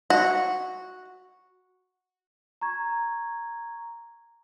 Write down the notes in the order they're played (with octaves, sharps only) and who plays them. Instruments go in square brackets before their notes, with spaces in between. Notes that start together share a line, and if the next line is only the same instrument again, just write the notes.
[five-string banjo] F#4
[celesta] A#5 C#6 G#6